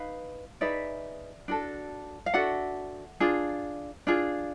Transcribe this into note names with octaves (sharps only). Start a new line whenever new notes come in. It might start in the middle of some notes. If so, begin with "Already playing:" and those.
Already playing: D#4 B4 F5
D#4 G#4 B4 D5 E5
D4 F#4 A4
F5
D4 F#4 A4 E5 F#5
D4 F4 G#4
D4 F4 G#4